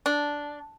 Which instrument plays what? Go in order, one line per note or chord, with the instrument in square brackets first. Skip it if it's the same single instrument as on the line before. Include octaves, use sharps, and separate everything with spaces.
[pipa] D4